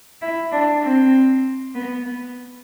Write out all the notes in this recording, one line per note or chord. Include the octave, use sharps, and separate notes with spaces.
E4
D4
C4
B3
B3